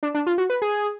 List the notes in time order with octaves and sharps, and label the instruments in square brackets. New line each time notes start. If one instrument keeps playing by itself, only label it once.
[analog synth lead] D4
D4
F4
F#4
B4
G#4